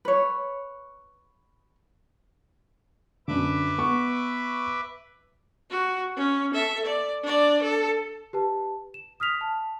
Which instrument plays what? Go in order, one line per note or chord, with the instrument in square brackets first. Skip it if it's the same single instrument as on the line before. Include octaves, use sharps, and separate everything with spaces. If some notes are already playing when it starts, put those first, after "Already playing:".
[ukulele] B4 C#5
[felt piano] F#2 D3 [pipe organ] B4 E5 D6
[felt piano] B3 C#6
[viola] F#4
C#4
A4 E5
D5
D4 D5
A4
[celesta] G4 B4 A5
E7
D#6 F6 B6 F7
A5